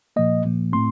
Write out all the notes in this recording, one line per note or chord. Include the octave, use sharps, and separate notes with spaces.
A#2 F3 A#3 D#5
A#2 F3 A#3
A2 A3 C4 C6